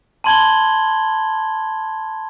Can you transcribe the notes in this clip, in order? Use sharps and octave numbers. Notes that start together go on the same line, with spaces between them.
A5 B5 C6 G#6 F#7 G7